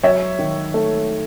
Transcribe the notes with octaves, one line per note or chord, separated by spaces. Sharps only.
F#3 C#5 E5
D#3
A3